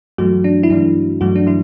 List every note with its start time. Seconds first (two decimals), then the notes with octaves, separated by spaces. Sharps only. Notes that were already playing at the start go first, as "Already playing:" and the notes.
0.18 G2 E3 F#3 A3 F#4
0.44 D4
0.63 E4
0.70 G2 E3 A3 D4
1.21 G2 E3 F#3 A3 F#4
1.36 D4
1.47 E3 E4